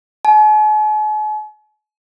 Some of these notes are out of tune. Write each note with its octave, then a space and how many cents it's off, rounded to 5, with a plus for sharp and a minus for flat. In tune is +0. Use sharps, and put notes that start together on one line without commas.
G#5 +45